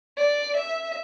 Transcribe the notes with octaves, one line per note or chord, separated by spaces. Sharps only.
D5
E5